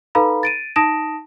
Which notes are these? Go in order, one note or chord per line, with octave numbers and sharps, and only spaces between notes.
D#4 A4 B4 F5 A#5 B5
A6 D7 D#7
D#4 A5 D#6 A#6 D7 E7